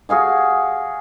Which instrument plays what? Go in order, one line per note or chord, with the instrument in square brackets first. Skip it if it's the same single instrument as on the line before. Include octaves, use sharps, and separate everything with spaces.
[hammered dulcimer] F#4 G#4 F5 G#5